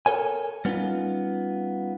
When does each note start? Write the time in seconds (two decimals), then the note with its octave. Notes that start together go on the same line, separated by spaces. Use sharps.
0.06 A4 A#4 C#5 G#5
0.65 G3 B3 C#4 D#4 F4